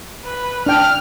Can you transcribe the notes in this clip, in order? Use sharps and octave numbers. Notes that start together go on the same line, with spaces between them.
B4
D4 G5 F6